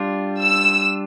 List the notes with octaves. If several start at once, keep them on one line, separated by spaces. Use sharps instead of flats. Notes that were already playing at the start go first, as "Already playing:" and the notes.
Already playing: G3 D4 F4
E6